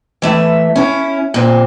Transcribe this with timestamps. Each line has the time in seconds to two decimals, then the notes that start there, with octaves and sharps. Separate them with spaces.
0.22 E3 A3 E5
0.76 C#4 E4
1.34 A#2 C4